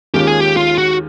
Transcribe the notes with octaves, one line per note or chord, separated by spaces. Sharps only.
D#2 D#3 G#3 C#4 F4 G4
G#4
G4
F4
F#4